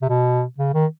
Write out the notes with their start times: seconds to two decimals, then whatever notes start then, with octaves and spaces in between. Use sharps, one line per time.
0.02 C3
0.09 B2
0.58 C#3
0.74 D#3